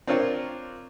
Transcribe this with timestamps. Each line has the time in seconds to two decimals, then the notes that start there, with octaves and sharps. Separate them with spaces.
0.07 C4 D4 F4 A#4 C#5